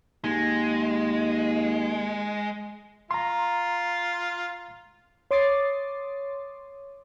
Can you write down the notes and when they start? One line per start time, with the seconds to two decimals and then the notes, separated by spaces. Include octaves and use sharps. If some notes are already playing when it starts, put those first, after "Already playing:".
0.24 D#2 G#3
3.11 F4 A#5 C6
5.31 C#5 C6 D6 D#6 A6 C7